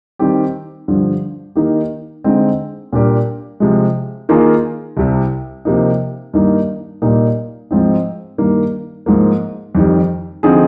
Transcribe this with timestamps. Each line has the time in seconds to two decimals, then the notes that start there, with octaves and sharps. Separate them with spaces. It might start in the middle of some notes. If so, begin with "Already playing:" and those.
0.19 D#3 G3 C4 G4
0.88 G2 D3 F3
1.56 D#3 A#3 D#4 G4
2.24 D3 G#3 C4 D#4
2.93 A#2 G3 D4 G4 A#4
3.60 C3 F3 G#3
4.29 D#3 A#3 F4 G#4
4.97 C2 C3 G3
5.65 C3 F3 A#3 D#4
6.34 G2 D#3 A#3 D#4
7.02 A#2 G3 A#3 D#4
7.71 G#2 F3 C4 D#4
8.38 G2 D#3 A#3
9.06 G#2 F3 A#3
9.75 F2 D#3 G3
10.43 D3 F3 C4 D#4 G#4